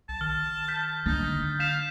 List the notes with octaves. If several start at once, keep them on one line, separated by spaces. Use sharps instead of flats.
B1 A5
D#3 F6
F6 G6 B6
D3 D#4 A6
F5 G6 B6 E7